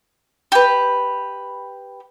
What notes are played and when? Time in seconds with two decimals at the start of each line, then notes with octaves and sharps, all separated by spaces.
0.52 G4 B4